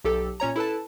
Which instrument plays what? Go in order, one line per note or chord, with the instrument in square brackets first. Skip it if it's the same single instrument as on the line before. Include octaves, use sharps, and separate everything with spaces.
[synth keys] B1 G4 A4
A#2 C#4 C#5 A#5
E4 A4 B4 A5